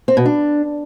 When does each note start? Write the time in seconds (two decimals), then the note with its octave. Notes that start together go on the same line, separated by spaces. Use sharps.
0.08 C4
0.17 B2
0.26 D4